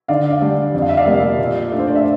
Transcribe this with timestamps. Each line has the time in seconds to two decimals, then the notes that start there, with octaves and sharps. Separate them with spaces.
0.08 D3 D5 F5
0.30 D5 F5
0.41 G3 D4
0.74 F2
0.82 F5
0.89 E5
0.97 D5 F5
1.06 C3 G3 A#3
1.39 A#2
1.71 A3 D4
1.79 C5
1.87 D5
1.96 E5